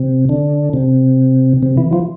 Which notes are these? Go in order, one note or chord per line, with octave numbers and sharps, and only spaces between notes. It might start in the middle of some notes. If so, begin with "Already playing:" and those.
Already playing: C3
D3
C3
C3
E3
F3